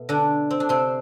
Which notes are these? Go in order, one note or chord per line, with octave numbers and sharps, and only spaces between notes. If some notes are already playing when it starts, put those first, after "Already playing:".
Already playing: B2 A3 B3
D3 D4
C4
D4
C3 C4